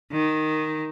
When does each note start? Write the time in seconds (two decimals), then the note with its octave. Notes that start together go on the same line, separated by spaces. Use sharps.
0.12 D#3